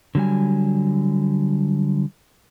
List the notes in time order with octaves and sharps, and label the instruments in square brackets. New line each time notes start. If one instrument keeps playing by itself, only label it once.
[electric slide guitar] D3 F#3 G3 G#5